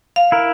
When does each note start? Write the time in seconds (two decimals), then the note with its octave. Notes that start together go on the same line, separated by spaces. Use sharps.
0.16 F5
0.32 E4 A#4